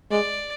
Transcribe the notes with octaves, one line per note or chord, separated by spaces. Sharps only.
G#3 D5